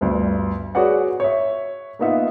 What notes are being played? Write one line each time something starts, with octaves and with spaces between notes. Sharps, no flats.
G1 D2 G2
F#4 G#4 B4 C#5 D5 F#5
C#5 E5
A#3 B3 D#4 F4 E5 F#5